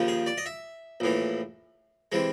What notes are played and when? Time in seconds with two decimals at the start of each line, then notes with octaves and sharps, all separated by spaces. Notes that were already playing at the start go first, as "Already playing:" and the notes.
Already playing: D#2 C#3 F3
0.08 G#4
0.26 D5
0.38 D#5
0.46 E5
1.00 A#1 A2 E3
2.12 C3 E3 G#3